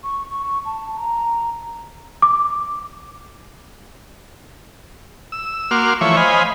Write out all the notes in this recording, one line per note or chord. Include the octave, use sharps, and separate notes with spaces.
C#6
C#6
A5
A#5
D6
E6
A#3 F#4 C6 D6 F6
E3 F3 A3 C#5 E5 C#6
C5 D#5 F5 G#5 B5